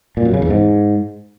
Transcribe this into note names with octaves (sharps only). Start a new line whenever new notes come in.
A#2
F#2
C#3
E2
G#2